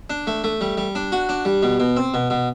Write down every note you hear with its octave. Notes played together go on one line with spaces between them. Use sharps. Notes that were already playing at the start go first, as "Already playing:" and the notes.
D4
A3
A3
G3
G3
D4
F#4
D4
G3
B2
B2
C4
B2
B2